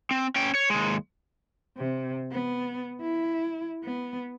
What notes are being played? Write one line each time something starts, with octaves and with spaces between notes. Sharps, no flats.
C4
C#4 G5
C#5
D#2 G#3
C3
B3
E4
B3